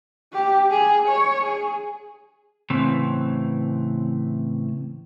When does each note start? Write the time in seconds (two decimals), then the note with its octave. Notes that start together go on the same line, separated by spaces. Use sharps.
0.33 G4
0.70 G#4
1.08 C#5
1.44 G#4
2.70 A2 C#3 E3 C4